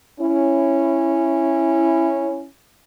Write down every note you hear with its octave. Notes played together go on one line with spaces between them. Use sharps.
C#4 E4